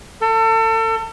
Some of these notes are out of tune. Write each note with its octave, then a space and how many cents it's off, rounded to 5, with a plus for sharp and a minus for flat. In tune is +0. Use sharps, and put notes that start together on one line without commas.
A4 +35